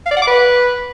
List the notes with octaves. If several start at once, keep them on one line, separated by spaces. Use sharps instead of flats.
F5
D5
F#5
D6
B4